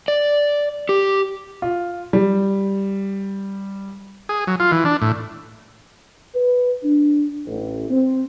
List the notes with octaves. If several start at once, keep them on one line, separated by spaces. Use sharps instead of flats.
D5
G4
F4
G3
G#4
F#3
F4
E3
D4
A2
B4
D4
A1
C4